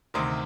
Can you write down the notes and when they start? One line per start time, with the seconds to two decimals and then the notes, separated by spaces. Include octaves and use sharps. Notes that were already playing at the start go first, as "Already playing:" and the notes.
0.14 D2 C3 D#3 C6 D#6